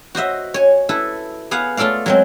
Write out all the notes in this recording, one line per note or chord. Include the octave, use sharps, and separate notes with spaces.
F#4 C5 D#5 E5
C#5 G#5
E4 A4 B4
B3 G#4 F5 F#5
A3 F4 A4 D5 F5
F#3 G#3 C4